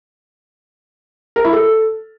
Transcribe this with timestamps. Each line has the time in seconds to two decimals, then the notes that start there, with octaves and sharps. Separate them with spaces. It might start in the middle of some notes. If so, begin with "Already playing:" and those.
1.36 A#4
1.44 E4
1.53 A4